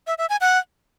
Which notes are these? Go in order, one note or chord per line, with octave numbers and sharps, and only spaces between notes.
E5
E5
G#5
F#5